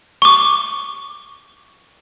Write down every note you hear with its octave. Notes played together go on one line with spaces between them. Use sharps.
C#6 D6